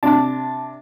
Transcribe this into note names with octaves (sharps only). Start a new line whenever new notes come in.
C3 D4 A5